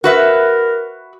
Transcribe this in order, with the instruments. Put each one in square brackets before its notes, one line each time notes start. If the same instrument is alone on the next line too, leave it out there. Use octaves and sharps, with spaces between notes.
[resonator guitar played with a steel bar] F#4 B4 E5 [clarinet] A#4